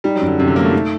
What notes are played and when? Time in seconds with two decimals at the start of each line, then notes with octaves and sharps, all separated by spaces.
0.04 G3 D#4
0.15 F#3
0.21 F#2
0.27 D3
0.39 F#2 C3
0.47 D3
0.56 F#3 A#3
0.64 A3
0.73 D#4